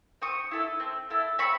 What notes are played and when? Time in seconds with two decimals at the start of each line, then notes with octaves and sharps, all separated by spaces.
0.22 C4 C#6 D#6
0.51 E4 A4
0.80 C4
1.10 E4 A4
1.39 C4 B5 C#6